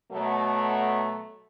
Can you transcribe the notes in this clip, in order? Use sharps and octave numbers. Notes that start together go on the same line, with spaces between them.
B2 F#3 A3